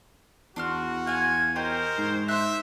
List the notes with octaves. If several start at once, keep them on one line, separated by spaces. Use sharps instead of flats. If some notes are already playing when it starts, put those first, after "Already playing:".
E2 D4 F#4 C6 F6
F4 F5 G#5
G4 A#4 C5 C#5 D#5
G#2
C5 E5 F#6